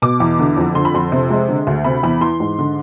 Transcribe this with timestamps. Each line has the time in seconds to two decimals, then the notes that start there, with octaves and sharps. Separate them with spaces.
0.02 B2 D6
0.20 E2
0.39 D3
0.57 F2
0.75 D3 C6
0.85 B5
0.94 F2 C6
1.12 C3
1.30 G#3
1.49 D3
1.67 D2
1.84 C3 B5
2.03 E2 B5
2.21 E3 C6
2.40 G#2
2.59 D3